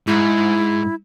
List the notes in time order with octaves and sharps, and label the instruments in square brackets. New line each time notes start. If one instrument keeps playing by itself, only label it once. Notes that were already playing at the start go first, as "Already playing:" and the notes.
[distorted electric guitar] G#2 [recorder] E4